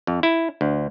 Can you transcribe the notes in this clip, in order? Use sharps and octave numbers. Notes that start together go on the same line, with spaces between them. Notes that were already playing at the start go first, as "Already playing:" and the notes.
F2
E4
D2